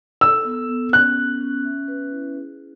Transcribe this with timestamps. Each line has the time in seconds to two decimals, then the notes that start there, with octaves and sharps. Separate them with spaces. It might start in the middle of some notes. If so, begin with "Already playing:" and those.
0.21 A4 E6
0.45 B3
0.69 B3
0.93 C#4 F#6
1.17 C#4
1.41 C#4
1.65 E5
1.88 B4
2.12 E4
2.36 G#4